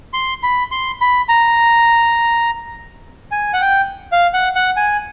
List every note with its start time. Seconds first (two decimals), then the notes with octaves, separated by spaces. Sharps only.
0.13 C6
0.43 B5
0.71 C6
1.01 B5
1.29 A#5
3.32 G#5
3.53 F#5
3.61 G5
4.12 F5
4.34 F#5
4.55 F#5
4.77 G#5